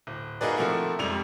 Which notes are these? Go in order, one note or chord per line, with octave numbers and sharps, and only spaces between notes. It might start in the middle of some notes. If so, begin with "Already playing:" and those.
D1
A#3 D#4 F#4 G#4 B4 D5
C3 F3 A3 A#3 E4 F#4
F2 G#2 C3 G3 F7